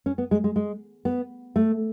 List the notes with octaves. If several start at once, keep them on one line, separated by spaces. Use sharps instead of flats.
C#4
B3
G#3
G#3
G#3
B3
A3